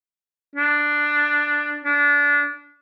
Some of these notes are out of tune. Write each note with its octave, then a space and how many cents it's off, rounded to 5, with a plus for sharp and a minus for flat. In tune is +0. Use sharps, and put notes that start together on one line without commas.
D4 +5
D4 -25